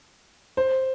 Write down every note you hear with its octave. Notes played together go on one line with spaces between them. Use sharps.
C5